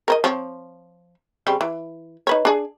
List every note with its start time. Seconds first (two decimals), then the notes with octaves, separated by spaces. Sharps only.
0.08 A#4 C5 D#5
0.24 F3 C4 C#5
1.47 C#3 G3 C4
1.61 E3
2.27 D#4 B4 C#5
2.45 D4 G#4